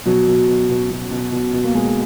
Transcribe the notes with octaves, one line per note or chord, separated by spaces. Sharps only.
B2 F#3
B2
B2
B2
B2
B2
B2
B2
A#3
B2 G#3